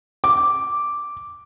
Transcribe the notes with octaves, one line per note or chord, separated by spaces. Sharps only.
D6